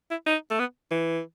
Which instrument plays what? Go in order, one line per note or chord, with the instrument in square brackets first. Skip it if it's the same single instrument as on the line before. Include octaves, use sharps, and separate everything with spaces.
[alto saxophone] E4
D#4
A3
B3
E3